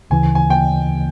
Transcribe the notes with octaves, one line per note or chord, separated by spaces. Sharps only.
D2 C#3 E3 G#5
G#5
G5